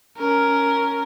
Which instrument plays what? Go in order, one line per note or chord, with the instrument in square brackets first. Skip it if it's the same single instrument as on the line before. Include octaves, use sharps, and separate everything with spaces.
[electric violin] C#4 A#4